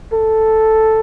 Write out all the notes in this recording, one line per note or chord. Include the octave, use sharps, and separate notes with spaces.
A4